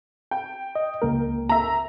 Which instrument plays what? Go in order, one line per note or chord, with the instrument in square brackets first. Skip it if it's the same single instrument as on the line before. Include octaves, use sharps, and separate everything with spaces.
[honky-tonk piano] G5
[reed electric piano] D#5
C#2 A#3 A#4
[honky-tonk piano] E5 A#5